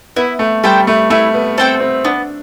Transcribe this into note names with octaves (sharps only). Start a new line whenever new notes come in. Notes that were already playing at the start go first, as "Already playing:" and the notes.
B3 E4
A3
G3 A4 C5 G5
A3
A3 E4
B3
C4 A4 C5 G5
C4
B3 D4